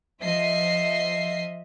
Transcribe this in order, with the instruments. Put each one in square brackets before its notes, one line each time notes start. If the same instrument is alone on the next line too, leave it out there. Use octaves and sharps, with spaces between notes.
[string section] F3 D#5 E5 C7